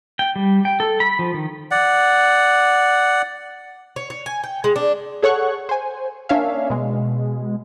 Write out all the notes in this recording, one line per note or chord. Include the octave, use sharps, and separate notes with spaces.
G5
G3
G5
A4
B5
F3
D#3
D5 F#5
C#5
C#5
G#5
G5
G#3
D4
G#4 A4 C#5 F#5 C#6 F#6
C5 G#5
A#3 C#4 D4 C#5 E5 F5
B2 G#3